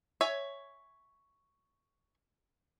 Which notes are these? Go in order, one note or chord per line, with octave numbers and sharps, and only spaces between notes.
C#5 E5 G#5